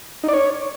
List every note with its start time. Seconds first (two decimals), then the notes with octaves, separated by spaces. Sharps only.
0.23 D#4
0.28 D5
0.33 C#5